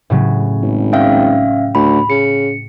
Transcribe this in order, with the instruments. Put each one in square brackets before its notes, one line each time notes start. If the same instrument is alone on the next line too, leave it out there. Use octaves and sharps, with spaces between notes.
[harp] A2 C#3 F#3
[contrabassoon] G#1
[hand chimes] C#4 E5 F5 [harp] G5
[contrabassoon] D2 [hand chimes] B5
[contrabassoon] C#3 [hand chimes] C#7